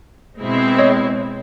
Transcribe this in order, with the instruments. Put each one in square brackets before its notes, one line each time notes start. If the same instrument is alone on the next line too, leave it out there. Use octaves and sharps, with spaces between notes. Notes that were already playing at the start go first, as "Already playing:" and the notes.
[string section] B2 G#3 C4 E4
[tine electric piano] C#5 D#5